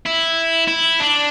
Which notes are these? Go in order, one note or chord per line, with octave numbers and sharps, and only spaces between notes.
E4
E4
D4